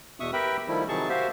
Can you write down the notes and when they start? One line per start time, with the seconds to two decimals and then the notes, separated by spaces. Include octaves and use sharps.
0.20 E2 B2 E5 C#6 D#6
0.33 G4 A#4 B4 E5 G5 B5
0.68 D#3 F3 G3 A3 E4
0.88 C3 D#3 F#3 G#4 A5 C#6
1.09 F#4 G4 C5 E5 F5